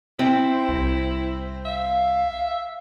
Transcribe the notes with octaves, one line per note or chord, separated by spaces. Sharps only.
C4 E4
C2
E5 F5